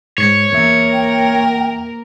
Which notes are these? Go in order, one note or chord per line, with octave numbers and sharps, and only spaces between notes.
G#2 C#5
E2 A#3 A#4 E5
G5